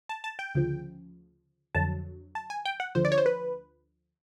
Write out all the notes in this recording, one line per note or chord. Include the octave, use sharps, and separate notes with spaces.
A5
A5
G5
D2 C#3 F3
F2 D3 F#3 A5
A5
G#5
G5
F#5
D2 D3 F3 C5
D5
C#5
C5
B4